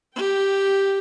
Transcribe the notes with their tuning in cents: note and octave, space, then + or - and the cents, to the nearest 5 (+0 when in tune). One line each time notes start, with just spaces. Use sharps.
G4 +0 G5 -10